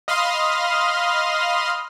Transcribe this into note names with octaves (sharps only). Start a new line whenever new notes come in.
D#5 F5 B5 C6 D#6 F6